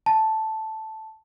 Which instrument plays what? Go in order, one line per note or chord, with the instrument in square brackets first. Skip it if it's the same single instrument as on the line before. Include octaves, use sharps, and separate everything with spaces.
[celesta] A5